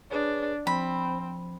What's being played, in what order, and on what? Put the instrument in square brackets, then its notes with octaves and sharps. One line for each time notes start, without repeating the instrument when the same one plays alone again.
[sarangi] D4 [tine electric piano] G#4 B4 C#5
[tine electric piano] F3 [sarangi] C4 [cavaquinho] B5